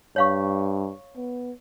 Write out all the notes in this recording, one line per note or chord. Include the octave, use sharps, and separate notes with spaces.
G2 C#5 F5 C#6
B3